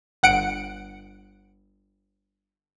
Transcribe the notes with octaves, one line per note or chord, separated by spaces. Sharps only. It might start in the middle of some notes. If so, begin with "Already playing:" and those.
G1 F#5 C#7 D7